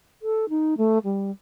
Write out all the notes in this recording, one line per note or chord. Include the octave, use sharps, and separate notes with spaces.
A4
D#4
A3
G3